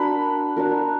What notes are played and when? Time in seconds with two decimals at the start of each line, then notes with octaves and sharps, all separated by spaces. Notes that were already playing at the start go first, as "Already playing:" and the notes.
Already playing: D4 F#4 A#4 B5
0.56 D4 F#4 A#4